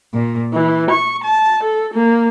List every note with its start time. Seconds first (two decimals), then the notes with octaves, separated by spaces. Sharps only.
0.14 A#2
0.53 E3
0.91 C#6
1.24 A5
1.63 A4
1.94 A#3